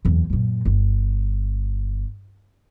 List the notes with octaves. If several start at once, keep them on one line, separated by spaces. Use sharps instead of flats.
F#1 E2
F#2 A#2
G1